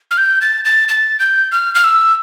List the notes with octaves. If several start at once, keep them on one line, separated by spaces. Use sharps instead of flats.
F6
G6
A6
A6
A6
G6
F6
F6
E6